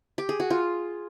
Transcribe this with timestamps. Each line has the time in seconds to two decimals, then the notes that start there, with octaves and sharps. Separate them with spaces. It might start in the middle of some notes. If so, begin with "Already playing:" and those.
0.18 G4
0.29 G#4
0.40 F#4
0.50 F4